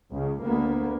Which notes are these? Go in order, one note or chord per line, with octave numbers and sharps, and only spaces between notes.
C#2 C#3
D2 A#3 B3